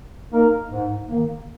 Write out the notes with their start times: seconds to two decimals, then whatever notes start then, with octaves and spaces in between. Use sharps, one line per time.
0.30 A#3 D#4 A#4
0.70 G#2
1.08 D#3 A#3